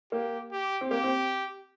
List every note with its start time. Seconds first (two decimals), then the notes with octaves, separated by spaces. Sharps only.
0.12 A#3 G4
0.52 G4
0.81 C4
0.91 A#3 G4
1.04 C4